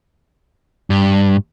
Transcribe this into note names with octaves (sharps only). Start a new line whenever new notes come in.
G2